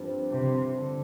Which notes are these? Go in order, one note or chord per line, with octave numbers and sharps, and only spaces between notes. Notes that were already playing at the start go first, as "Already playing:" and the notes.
Already playing: G2 F3 C4
C3
D3